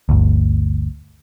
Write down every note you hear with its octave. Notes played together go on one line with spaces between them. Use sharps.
G1 D2